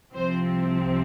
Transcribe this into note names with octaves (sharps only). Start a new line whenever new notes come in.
C2 C3 F3 C4 C5